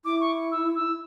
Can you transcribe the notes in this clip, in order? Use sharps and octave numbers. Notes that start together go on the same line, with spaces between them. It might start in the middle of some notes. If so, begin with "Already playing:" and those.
E4 D6
C#6
E6
E6